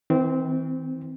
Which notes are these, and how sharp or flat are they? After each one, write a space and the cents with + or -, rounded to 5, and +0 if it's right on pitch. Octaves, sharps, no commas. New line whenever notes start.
E3 -45 C4 -15